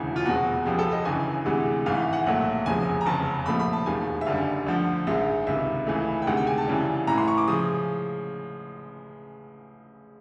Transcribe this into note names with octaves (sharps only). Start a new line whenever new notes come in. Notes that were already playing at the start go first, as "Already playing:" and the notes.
Already playing: E1 D2 C#3 E3 F#4
F4
F1 E2 B2 G#3 F#4
C#2 C#3 F3 G#3 G4
A4
D#5
G1 F#2 C#3 E3 G#5
D2 C3 E3 G#3
G#1 G#2 E3 F5
E5
F#5
B1 A#2 F#3 A3 F#5
F1 E2 C#3 F3 G#3 G#5
A#5
F1 E2 C#3 A5
C2 A#2 F3 A3 B5
B5
A5
E1 D#2 D#3 G#3 G#5
E5
F#1 F#2 D3 G3 F5
D2 D3 F3
A#1 G#2 D#3 G#3 E5
C#2 C3 D#3 E5
C#2 C#3 E3 A3
G5
D2 C3 D#3 G#3 F#5
G5
G#5
A5
F#2 C#3 E3 G3
A1 A2 E3 A#5
C6
C#6
D6
C#3 F3 G#3 D#6